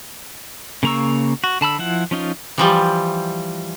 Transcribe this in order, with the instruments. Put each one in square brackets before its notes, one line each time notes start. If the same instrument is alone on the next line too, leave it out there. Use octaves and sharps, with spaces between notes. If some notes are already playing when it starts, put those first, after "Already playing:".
[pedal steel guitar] C#3 A#3 A#5 C#6 E6
F#4
D3 A5 B5 E6
F3 E4 F#5
F3 C#4 D#4 F4
[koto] E3 F3 G3